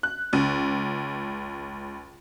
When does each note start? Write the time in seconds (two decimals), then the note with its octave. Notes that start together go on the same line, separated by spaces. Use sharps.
0.03 F#6
0.33 C#2